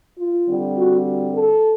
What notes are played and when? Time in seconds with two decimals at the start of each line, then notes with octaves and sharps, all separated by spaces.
0.19 F4
0.47 D3 G3 C4
0.77 F#4
1.35 A4